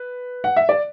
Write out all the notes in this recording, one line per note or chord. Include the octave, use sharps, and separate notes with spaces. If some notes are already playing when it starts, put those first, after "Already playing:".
Already playing: B4
F#5
E5
D5